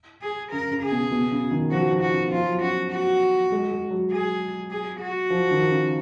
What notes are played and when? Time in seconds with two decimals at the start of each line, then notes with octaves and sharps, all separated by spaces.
0.22 G#4
0.51 C#3 A#4
0.71 C#3
0.82 G#4
0.92 B2
1.12 B2
1.32 C#3
1.51 D#3
1.71 F3 F#4
1.91 F3
2.01 F#4
2.11 C#3
2.31 F3 F4
2.46 F#3
2.62 C#4 F#4
2.91 F#4
3.52 G#3
3.71 G#3
3.91 F#3
4.11 G#4
4.71 G#4
5.01 F#4
5.30 F3
5.51 D#3
5.71 C#3